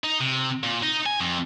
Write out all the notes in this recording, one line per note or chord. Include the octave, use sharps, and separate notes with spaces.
D#4
C3
A#2
D#4
G#5
F2